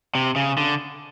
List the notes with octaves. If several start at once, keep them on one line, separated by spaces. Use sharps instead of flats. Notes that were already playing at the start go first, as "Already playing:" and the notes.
C3
C#3
D3